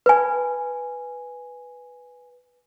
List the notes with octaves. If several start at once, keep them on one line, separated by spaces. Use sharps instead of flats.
B4 G#5